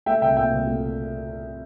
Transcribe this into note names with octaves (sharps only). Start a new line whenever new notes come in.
A3 E5 G5
C2 E5 G5
A#2 E5 G5
C2
A3